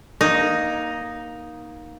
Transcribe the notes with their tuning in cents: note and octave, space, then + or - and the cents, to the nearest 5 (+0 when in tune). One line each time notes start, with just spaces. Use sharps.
A#3 +20 D#4 +0